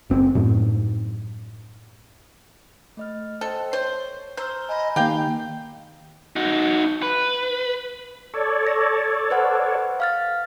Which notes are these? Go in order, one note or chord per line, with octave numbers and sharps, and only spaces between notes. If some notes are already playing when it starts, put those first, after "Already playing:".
F#1 C4
F#2 A2
A3 D#5 F6
A4 C5 D#5 G5
C5 C#5
C5 A#5 E6 F6 G6
D#5 G#5 A#5 B5
D#3 A#3 G4 F5 G5
D#4 F#4
B4
A4 C#5 D5
A#6
B4 C5 F#5
F5 F6 A6